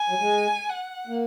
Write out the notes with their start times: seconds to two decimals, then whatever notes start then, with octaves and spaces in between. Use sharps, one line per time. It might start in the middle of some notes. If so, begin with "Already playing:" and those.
Already playing: G#5
0.10 F#3
0.20 G#3
0.69 F#5
1.07 A#3